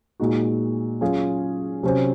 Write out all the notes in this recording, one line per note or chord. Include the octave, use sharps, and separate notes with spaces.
A#2 G#3 D#4 F#4
F#3 C#4 F4 G#4
C3 F#3 C#4 F#4 C5